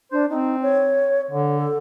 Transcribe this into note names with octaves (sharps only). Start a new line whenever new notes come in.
D4 C5
C4 D#4
C#5
D3
A4